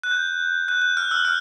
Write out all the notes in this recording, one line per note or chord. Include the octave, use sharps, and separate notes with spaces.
F#6
G6
F#6
F#6
F6
E6
F6